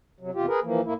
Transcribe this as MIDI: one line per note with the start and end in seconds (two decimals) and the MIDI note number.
0.20 0.31 48
0.20 0.31 54
0.34 0.46 40
0.34 0.46 48
0.34 0.46 65
0.34 0.46 67
0.48 0.60 68
0.48 0.60 70
0.48 0.60 71
0.63 0.81 52
0.63 0.81 53
0.63 0.81 58
0.85 0.94 45
0.85 0.94 58
0.85 0.94 64